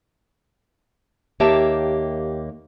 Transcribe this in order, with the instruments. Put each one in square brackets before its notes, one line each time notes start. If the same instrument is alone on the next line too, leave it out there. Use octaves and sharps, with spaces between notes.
[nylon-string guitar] D#2 A#3 G4 C#5 E5 A5